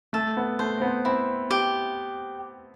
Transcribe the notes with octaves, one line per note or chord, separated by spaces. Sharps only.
A3 A4
B3
A3 C5
C4
B3
C4 E4
G4